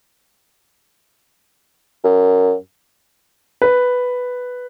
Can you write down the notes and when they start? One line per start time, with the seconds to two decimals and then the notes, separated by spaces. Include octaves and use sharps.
2.04 F#2
3.62 B4